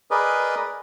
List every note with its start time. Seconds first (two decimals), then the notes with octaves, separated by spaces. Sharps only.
0.11 G#4 A#4 B4 D5 D#5